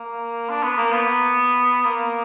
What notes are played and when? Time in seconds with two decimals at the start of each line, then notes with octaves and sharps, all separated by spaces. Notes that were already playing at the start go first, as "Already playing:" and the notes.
Already playing: A#3
0.49 D4
0.63 B3
0.77 A#3
0.92 B3
1.85 A#3